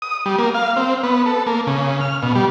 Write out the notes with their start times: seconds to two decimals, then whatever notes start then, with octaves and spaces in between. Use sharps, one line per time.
0.02 D#6
0.26 G3
0.39 A#3
0.55 F5
0.76 C4
1.03 B3
1.26 A4
1.47 A#3
1.67 C#3
2.01 F6
2.23 B2
2.35 G3